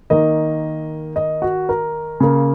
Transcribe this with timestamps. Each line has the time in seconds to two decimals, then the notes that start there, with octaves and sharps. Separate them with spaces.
0.10 D#3 A#3 D#5
1.16 D#5
1.42 F#4
1.69 A#4
2.20 C#3 A#3